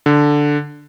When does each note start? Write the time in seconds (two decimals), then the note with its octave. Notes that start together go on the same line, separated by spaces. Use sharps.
0.06 D3